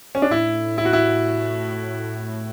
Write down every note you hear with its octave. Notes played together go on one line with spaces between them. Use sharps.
C#4
D4
A2 E4
E4
F#4
E4